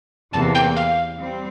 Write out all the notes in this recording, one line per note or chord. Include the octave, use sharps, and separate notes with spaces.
E2 C3 E3 A#3 A5
G5
F5
G3 C4